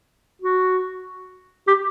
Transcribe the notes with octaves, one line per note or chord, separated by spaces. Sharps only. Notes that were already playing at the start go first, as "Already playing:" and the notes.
F#4
G4